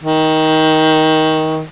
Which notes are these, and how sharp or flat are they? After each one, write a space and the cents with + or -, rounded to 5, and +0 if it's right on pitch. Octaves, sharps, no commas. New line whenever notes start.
D#3 +15